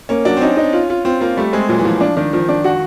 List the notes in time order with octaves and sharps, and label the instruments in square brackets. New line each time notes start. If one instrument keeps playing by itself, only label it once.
[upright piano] A#3 [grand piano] C#4
[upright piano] F#3 [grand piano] D4
[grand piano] C4
[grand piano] C#4 [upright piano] D#4
[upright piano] D#4
F4
F4
[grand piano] C4 [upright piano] F4
[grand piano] A#3 [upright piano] F4
[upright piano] G3 [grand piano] A3
[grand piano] G#3 [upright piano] C4
[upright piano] A#2 [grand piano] F#3
[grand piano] E3
[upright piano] A#2 [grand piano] F3
[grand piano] F3 [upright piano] D4
[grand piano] D#3 [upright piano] D4
[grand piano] D#3 [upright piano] F3
[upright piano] D4
F#4